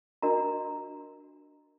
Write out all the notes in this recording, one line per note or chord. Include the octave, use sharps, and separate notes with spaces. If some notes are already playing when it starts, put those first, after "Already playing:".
D4 F#4 A#4 D#5 A#5